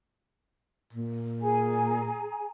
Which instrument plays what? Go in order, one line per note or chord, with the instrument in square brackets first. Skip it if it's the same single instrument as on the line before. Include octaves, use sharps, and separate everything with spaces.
[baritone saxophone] A#2
[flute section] G#4 G#5 A#5